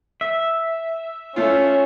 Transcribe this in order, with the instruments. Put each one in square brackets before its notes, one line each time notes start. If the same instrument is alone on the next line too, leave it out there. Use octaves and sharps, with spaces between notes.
[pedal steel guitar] E5
[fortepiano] A3 F4 [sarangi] C#4